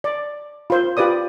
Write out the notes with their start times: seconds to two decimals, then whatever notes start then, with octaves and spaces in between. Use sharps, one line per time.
0.04 D5
0.70 F4 C5
0.97 F4 G4 B4 D5 D#6